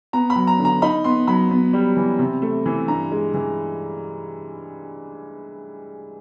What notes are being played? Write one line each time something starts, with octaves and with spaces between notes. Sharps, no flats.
B3 A#5
B5
F#3
A#5
D3
A#5
D#4 B5
B3 C6
F#3 B5
B3
G3
E3
C3
A3
E3
G2 A#5
G#3
E3